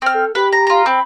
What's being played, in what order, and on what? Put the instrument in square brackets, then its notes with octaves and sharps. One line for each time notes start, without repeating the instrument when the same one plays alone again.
[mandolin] C4 F6
[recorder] A4
[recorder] G4 [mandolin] B4
[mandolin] A#5
F4 A#5
[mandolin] C4 [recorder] B5